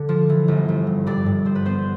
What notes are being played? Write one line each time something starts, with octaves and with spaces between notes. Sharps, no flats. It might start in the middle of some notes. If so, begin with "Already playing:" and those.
Already playing: D3
F3
E3
G1
G1
G2
G2 D5
G2
G2 C5
B4
B3 C5